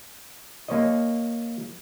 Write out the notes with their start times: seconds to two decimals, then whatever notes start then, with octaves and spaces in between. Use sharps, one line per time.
0.68 A#3 C#5 D#5